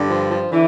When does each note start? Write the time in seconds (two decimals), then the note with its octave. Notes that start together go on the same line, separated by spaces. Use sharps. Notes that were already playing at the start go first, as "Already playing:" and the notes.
Already playing: G2 D3
0.09 F3
0.31 F3
0.51 D3 E3